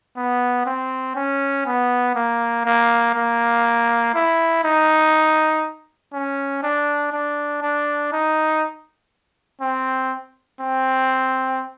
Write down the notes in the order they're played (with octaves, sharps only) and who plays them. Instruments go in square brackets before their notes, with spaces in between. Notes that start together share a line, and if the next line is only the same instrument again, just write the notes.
[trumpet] B3
C4
C#4
B3
A#3
A#3
A#3
E4
D#4
C#4
D4
D4
D4
D#4
C4
C4